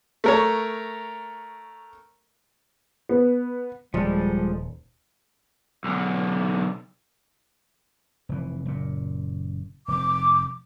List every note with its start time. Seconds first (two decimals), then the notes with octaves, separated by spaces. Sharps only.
0.24 A3 A#4 C#5
3.09 B3
3.94 D#1 F3 G3 G#3 A4
5.84 B1 D3
8.29 F1 E3
8.66 F#1 A#2
9.88 F1 D6